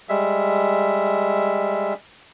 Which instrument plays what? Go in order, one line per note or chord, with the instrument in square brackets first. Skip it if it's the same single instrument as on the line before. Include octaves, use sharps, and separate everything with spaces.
[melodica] G3 G#3 E5